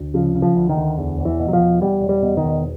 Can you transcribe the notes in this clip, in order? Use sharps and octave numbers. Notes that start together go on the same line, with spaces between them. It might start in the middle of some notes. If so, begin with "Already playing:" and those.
Already playing: D2
C#3 F3
C#3
F3
D2
D#3
D2
E2
E1
E3
B2
F#3
F3
E1
E2 G3
E1
G3
B2
D#3
E1